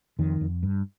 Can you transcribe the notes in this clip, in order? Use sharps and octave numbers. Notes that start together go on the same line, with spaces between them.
F2 D#3
F2
G2